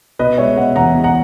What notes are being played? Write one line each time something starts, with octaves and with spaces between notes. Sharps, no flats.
B2 B4 D#5
G#3 C#5 E5
B2 D#5 F#5
E2 F#5 A#5
E2
F#5 A#5